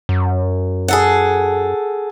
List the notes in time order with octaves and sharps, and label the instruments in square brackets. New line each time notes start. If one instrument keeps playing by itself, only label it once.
[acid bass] F#2
[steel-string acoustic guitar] G#4 A4 F#5